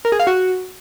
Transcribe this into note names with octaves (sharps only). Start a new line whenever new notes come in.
A#4
G#4
F5
F#4